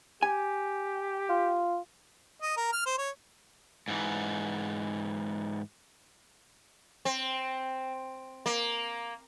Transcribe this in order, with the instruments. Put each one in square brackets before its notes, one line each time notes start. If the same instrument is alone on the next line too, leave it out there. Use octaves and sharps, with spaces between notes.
[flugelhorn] G4 [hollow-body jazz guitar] G#5
[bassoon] F4
[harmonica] D#5
A#4
F6
C5
C#5
[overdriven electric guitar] G#2 E3
[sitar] C4
A#3